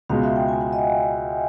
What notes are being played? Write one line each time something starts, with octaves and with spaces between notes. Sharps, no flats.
C#2 B2 G#3 F5
E5
G5
G#5
F#5
D#5